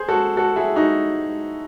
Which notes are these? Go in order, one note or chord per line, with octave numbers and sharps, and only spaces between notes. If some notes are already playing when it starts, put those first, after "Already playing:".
Already playing: G#4 C5
F#4 A4
F#4 A4
E4 G#4
D#4 F#4